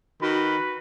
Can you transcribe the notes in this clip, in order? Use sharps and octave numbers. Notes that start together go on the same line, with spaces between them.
D#3 F#4 B4 B5